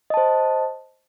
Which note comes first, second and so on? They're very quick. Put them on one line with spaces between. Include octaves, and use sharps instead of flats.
D#5 A5 C5